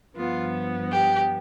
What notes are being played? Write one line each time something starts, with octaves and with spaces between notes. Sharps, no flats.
G2 F3 B3 F4
G4